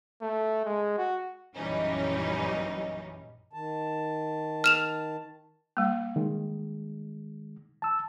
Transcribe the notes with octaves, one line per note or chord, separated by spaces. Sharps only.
A3
G#3
F#4
A#1 F#2 E3 G3 C#4 D#4
D#3 A5
F6 E7 F7
G3 A#3
D#3 G#3
A5 E6